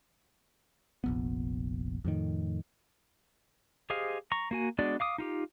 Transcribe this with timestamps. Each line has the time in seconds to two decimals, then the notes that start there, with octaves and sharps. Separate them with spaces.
1.04 F1 A#1 B3
2.05 F2 A2 D#3
3.90 G4 G#4 C5 D#5 F5
4.32 A#5 C#6
4.51 A#3 F#4 G#5
4.79 G#3 B3 D4 F#4 D5
5.00 F5 D6 D#6
5.18 D#4 F4 G4